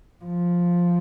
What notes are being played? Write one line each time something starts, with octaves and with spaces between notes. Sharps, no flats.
F3